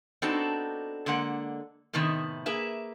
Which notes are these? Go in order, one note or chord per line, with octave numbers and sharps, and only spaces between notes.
B3 C4 D4 D#4 F#4 A4
D3 G#3 A#3 F#5
A2 C3 D#3 B3 D#4 E4
A#3 G#4 B4 E5